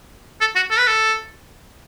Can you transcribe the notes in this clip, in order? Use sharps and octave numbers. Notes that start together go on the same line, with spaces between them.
A4
F#4
A4
B4
A4